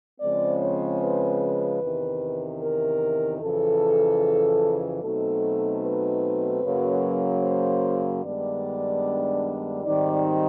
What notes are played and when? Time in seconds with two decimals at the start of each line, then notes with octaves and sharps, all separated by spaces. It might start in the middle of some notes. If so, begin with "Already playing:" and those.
0.20 C#3 F3 G#3 C4 D5
0.61 C#5
1.01 B4
1.82 E2 C3 D#3
2.62 A#4
3.41 F2 C#3 E3 A4
5.02 B2 F#3 A3 C4 D#4 A4
5.83 B4
6.62 F#2 C#3 F#3 A#3
7.43 C5
8.24 G2 D#3 G#3 B3 D4 D5
9.84 G#2 D#3 G3 C4 D#4 D5